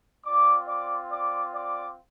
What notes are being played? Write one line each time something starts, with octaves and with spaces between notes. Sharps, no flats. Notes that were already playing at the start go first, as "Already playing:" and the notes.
C4 F4 D5 D6
D5 D6
D5 D6
D5 D6